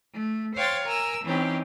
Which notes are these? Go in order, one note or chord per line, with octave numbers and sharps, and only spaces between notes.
A3
C5 C#5 F5 G5 C6 A6
A#4 G#5 A#5 E6
E3 C4 C#4 D#4 G4